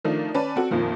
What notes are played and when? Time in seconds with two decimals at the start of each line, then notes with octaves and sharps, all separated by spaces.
0.05 D#3 F3 A3 D4 D#4
0.35 C#4 B4 D5 A5
0.56 C4 F#4 A4
0.71 A#1 F2 A#2 D#3 F3